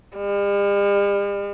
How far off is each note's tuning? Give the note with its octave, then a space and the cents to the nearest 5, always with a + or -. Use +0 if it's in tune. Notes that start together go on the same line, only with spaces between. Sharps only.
G3 +45